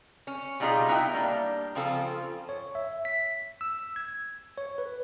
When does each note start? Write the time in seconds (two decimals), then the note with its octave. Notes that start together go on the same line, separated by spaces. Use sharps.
0.27 C#4
0.60 B2 G3 D#4 F4 G4 G#4
0.88 B3 D#4 E4 E5 G5
1.13 G3 A#3 D4
1.75 C#3 F3 C4 F4 A4
2.49 C#5
2.75 E5
3.05 B6
3.61 E6
3.96 G#6
4.58 C#5
4.78 B4